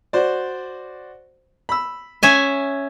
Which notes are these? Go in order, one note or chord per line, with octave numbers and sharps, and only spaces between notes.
F#4 C5 D5
B5 E6
C#4 E5 G#5